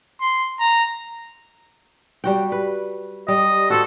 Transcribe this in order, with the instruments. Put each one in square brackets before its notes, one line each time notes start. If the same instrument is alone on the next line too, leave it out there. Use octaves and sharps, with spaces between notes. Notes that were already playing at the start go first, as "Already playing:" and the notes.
[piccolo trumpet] C6
A#5
[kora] G3 F#4 G5
B4
[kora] G3 [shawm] D#5
[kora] F#4 C5 F#5 [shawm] A4